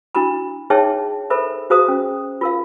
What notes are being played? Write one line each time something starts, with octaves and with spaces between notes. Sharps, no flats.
D4 E4 F#4 A#5 B5
D#4 G#4 C#5 E5 G5 A5
A4 A#4 C5 E5 B5
F#4 G#4 C5 F5 A#5 D#6
C#4
F4 A#4 F5